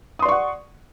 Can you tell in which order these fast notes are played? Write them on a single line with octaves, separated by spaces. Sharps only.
D#6 C6 D5 C#6 F#5